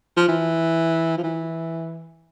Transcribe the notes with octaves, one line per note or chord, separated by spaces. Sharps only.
F3
E3
F3
E3